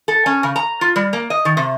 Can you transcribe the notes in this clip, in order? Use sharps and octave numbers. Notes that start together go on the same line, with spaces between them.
A4
C#4
C#3
A#5
F4
G3
A#3
D#5
D#3
C3